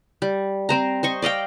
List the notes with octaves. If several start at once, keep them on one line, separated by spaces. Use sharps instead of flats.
G3
C4 C5 A#5
C5 D#5 C#6
D5 D#5 F5 G5